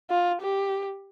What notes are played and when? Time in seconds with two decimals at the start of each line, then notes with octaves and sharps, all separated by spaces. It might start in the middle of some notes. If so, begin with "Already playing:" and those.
0.10 F4
0.41 G4